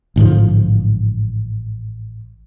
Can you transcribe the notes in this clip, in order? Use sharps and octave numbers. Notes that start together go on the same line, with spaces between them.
A1 G#2 D3 F3